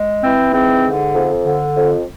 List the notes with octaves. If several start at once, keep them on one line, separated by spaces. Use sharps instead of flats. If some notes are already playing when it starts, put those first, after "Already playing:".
Already playing: G#3
E3 C4
G#2 C4
D3
F2
D3
F2